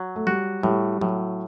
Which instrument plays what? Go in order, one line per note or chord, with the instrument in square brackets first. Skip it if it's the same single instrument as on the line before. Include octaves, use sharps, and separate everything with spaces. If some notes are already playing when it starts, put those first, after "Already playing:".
Already playing: [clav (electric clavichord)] F#3
[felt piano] A3
[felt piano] G3 [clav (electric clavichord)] F#4
[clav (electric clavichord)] A2 [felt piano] G3
[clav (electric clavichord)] A2 [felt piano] F#3